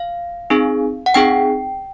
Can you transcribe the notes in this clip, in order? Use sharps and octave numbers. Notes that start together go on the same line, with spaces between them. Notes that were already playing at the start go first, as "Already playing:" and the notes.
Already playing: F5
C4 D#4 G#4
F#5
C4 D#4 G#4 G5